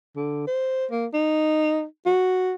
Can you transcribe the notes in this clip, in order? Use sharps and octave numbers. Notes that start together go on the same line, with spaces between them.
D3
C5
A#3
D#4
F#4